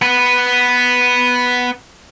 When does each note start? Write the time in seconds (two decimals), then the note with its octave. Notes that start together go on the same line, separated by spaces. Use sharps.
0.02 B3 B4